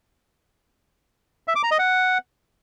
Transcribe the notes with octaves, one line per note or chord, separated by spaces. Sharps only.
E5
D6
A#5
D#5
F#5